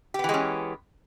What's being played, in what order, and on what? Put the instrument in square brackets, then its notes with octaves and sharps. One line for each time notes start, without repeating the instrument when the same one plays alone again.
[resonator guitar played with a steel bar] G4
B3
E3
G#3
C#4